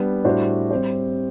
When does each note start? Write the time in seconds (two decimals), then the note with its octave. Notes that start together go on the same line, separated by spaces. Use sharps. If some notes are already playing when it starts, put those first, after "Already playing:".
Already playing: G3 B3 D4
0.24 A2 G3 D4 F#4 C5
0.71 G3 C4 G4 C5